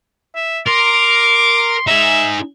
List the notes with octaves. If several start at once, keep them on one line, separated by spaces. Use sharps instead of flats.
E5
A#4 C6 D6
D#4 G#4 E5